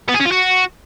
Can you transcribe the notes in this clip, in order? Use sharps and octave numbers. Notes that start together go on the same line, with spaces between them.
B3
G#4
C#4
F4
F#4